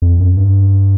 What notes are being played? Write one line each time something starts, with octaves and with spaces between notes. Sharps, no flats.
F2
F#2
G2